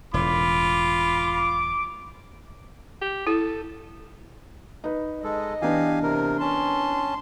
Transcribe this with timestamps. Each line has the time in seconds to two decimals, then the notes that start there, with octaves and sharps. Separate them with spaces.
0.14 E1 A2 F4 B5 D6
3.01 G4
3.27 E4 A4
4.84 D#4 B4
5.24 G#3 A4 D#5
5.62 E3 B3 D4 G4 F5 G#5
6.03 C3 A#4
6.40 C#4 A5 C6